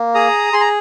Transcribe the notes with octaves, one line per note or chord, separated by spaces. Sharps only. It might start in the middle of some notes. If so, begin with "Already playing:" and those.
Already playing: A#3
G#4 A#5 D#6
G#4 C6
A#5